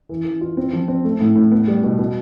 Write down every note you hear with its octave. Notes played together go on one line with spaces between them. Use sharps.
E3
E3
F4
C4
F3
C4
A3
A2
A2
B3
G3
B2
B2